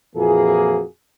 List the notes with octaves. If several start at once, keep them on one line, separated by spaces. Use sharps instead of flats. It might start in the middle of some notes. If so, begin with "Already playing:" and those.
F2 A#2 E3 A#3 F#4 G#4